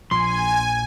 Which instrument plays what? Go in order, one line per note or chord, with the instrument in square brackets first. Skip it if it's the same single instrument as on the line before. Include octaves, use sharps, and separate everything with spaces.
[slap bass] A#1 F3 [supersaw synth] G#5 [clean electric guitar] C6